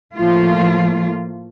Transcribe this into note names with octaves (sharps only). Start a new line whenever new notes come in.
A2 F3 A3 A#3 F4